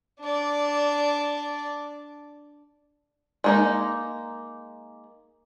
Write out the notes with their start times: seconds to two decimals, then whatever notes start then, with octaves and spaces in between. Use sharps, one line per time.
0.21 D4 D5
3.44 G#3 A#3 D#4